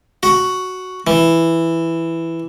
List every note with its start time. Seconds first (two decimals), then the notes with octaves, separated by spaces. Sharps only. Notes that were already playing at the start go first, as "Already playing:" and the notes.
0.23 F#4
1.07 E3